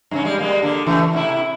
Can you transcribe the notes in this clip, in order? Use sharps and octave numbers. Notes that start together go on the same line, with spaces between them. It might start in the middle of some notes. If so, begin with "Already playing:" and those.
G2 C#3 C#4
G3 G#3
G3 G#3 A#3
D3 A#3
C#3 E3 A3
A2 C3 E4